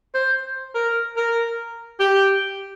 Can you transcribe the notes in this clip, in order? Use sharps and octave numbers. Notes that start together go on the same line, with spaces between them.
C5
A#4
A#4
G4